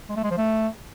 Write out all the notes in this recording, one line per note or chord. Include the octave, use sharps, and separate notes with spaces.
G#3
A3
G#3
F3
A3